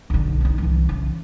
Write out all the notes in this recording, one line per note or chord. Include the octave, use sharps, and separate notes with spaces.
B1 D3
D3 D#4
C2 E3
C#3